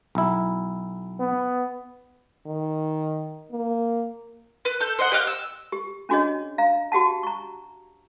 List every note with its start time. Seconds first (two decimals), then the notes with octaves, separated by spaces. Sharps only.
0.15 B1 E4
1.20 B3
2.46 D#3
3.51 A#3
4.65 B4
4.80 A4 G6
4.99 C5 D#5 F#5
5.12 G4 D#5 F5 F#6
5.27 E6
5.72 G4
6.09 C#4 D4 F#4 G#4 C#5 D#5
6.58 F5 A#5
6.92 F#4 G4 F#5 A5
7.23 A#5 C#6